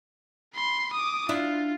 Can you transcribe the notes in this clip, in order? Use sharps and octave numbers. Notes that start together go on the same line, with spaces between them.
B5 C6
D6 D#6
D4 E4 F4